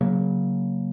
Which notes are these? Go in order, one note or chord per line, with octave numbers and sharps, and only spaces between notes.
C#3 F#3 A#3